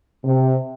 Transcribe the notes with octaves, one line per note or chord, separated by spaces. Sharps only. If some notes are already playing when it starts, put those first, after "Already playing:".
C3